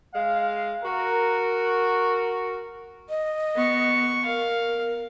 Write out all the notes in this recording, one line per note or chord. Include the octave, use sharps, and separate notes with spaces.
G#3 F5
F#4 A#4
D#5
B3 C#6
A#4 F5